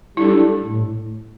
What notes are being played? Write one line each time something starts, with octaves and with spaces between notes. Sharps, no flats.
G3 D4 E4 A4
A2